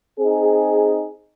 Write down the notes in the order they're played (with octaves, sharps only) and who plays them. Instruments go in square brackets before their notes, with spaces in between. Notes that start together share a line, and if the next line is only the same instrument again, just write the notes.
[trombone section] C4 D#4 G#4